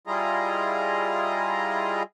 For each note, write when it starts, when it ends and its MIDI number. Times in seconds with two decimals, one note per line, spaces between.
0.07 2.03 55
0.07 2.03 64
0.07 2.03 65
0.07 2.03 68
0.07 2.03 75
0.07 2.03 82